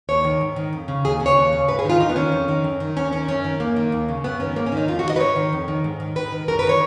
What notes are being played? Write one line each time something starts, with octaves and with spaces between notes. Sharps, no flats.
D#2 C#5
D#3
G#2
D#3
F2
C#3
D#2 G#4
C#3
C#5
D#2
C#3
G#2 B4
G#4
D#3 F4
F2 D#4
B3
D#3 C#4
F2
D#3
F#2
D#3
D#2 C#4
D#3 C#4
F#2 C#4
D#3
F#2 A#3
D#3
D#2
C#3
F#2 B3
D#3 C#4
G#2 A#3
C#4
D#3 D#4
F2 F4
F#4
D#3
D#5
B4
G#2 C#5
D#3
F2
D#3
G#2
D#3
G#2 B4
D#3
F#2 A#4
B4
D#3
C#5